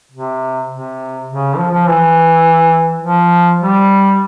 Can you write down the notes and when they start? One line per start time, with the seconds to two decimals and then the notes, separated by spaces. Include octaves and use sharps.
0.12 C3
0.70 C3
1.28 C#3
1.57 F3
1.72 F3
1.87 E3
3.02 F3
3.60 G3